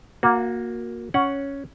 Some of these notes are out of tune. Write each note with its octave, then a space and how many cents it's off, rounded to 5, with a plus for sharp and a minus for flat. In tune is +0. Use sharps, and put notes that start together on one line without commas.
A#3 +5 F#4 -25
C#4 +5 F#5 +0